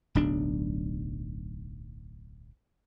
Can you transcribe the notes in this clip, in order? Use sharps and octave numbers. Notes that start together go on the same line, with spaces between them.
D1 B1 D4